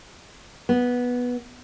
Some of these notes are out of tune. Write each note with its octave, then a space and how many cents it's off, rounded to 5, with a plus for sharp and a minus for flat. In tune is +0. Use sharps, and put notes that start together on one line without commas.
B3 -10